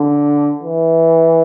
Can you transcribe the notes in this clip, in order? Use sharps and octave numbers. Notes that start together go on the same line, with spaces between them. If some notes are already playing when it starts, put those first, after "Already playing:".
Already playing: D3
E3